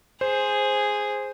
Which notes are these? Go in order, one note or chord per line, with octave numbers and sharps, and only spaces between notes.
G#4 C5